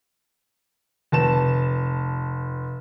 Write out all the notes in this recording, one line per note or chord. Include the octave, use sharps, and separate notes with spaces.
F1 A5 E7